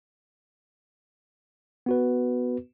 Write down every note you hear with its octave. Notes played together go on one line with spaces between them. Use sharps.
B3 F#4 B4